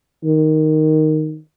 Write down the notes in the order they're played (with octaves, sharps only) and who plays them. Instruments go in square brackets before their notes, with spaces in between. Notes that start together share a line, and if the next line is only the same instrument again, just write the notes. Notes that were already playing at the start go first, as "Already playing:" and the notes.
[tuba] D#3